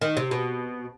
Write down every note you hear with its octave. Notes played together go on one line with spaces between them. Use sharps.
D#3
C3
B2